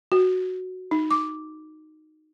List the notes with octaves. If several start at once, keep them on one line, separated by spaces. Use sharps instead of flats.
F#4
D#4
D6